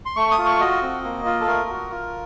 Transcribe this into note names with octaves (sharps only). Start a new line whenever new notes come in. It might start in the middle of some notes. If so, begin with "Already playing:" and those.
C6
A3 C#6
D#6
F4
C#6
F#4 D#5
C4
A#3
F4
A4
A3 A#4
F#4
F4